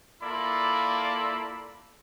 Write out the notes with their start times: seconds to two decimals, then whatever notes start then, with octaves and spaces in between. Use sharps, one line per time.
0.22 A#3 E4 F4 A4 D5 B5